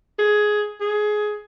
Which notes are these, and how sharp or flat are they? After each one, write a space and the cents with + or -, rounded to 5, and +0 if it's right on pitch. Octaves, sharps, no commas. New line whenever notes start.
G#4 +10
G#4 +15